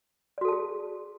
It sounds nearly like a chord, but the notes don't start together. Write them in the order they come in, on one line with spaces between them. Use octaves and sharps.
D5 F#4 A4 A5 G#4